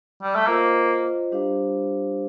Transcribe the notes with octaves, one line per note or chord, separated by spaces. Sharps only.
G3
A3
A#3 F4 C5 D#5
G3 D4 G4 C5 F5